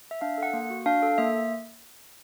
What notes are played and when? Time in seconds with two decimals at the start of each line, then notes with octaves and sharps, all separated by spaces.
0.11 E5
0.21 D4 F5
0.38 A4 F#5
0.53 A#3
0.70 F#4
0.86 D4 F5
1.02 A4
1.18 A#3 E5